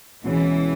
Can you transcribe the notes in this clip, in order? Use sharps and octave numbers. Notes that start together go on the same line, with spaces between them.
C#2 B2 E3 G#3 C#4